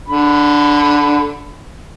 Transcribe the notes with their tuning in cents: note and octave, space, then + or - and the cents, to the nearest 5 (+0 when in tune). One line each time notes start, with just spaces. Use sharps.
D3 +0 B5 +20